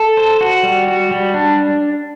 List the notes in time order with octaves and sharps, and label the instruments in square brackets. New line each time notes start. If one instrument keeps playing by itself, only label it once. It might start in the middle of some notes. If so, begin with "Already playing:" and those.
Already playing: [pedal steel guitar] A4
C5
F#4
G3
F#4
G3
D4